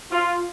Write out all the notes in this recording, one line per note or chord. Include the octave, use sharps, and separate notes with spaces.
F4